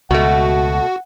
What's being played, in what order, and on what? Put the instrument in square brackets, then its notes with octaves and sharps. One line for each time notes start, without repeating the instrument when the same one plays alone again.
[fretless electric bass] C#2 [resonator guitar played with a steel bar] B2 A3 [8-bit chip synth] F#4 [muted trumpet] F#5